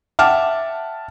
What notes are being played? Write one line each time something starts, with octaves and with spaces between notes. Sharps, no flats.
E5 F#5 G5 A5 D6 F6